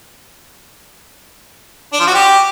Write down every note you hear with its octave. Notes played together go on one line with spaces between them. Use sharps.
D4
F3
F#4
G4